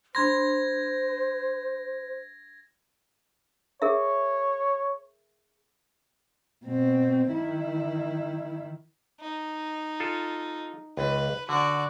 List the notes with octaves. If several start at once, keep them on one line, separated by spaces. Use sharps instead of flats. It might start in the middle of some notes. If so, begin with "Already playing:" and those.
D4 C5 B5 C6 G#6 A#6
G#4 A#4 C#5 E5
B2 C4
D#3 E4
D#4
F4 A4
C#2 B4
D3 F#4 D5